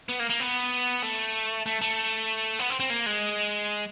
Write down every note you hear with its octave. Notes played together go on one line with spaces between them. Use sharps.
B3
A#3
A#3
B3
A3
A3
A3
B3
C4
C4
A#3
G#3